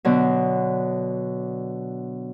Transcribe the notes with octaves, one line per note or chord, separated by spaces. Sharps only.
B2 D3 F#3